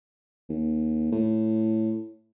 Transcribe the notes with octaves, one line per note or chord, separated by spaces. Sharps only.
D#2
A2